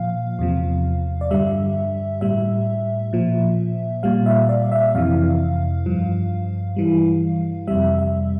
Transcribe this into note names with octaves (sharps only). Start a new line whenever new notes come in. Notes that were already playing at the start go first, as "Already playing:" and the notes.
Already playing: A#2 F3 F5
E2 C3 F3
D5
G2 D3 G3 E5
A2 G3 E5
A#2 F3
A#2 G3 F5
E5
D5
E5
F2 C3 E3 F5
G2 F3
G2 E3 G3
F2 C3 G3 E5
E5